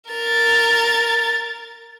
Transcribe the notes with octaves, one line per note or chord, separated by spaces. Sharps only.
A#4 A6